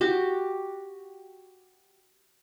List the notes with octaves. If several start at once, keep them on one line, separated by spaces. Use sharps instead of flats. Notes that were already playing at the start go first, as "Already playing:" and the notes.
F#4 G4